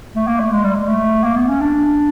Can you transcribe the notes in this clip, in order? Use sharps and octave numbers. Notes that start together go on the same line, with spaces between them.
A3
A#3
A3
G#3
G3
G#3
A3
A#3
B3
C#4
D4